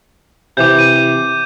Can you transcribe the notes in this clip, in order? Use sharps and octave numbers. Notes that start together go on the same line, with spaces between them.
C3 E3 D6 G6
D#7